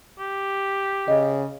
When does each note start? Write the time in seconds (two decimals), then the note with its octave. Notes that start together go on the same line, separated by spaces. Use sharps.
0.19 G4
1.08 C#3 D#5